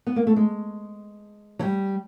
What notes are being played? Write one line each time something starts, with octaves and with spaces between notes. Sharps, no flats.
B3
A#3
A3
G#3
F#3
G3